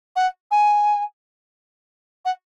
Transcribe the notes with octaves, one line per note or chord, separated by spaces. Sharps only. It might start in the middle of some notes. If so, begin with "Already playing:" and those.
F#5
G#5
F#5